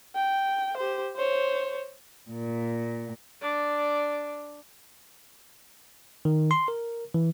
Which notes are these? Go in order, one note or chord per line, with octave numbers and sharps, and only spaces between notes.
G5
G4 C5
C5 C#5
A#2
D4 D5
D#3
C6
A#4
E3